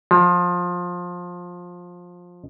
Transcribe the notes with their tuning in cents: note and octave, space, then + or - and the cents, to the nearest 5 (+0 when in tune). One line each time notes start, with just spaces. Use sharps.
F3 +20